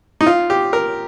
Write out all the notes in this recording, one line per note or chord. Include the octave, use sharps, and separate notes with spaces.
D#4
F4
G4
A#4